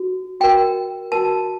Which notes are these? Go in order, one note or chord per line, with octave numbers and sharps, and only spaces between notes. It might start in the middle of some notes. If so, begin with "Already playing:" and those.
Already playing: F#4
F#4 A#4 G5
F#4 A#4 A5